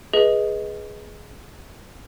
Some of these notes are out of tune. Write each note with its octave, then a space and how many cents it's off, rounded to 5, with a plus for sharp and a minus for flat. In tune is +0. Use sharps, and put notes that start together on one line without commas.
G#4 +5 B4 -15 D#5 +15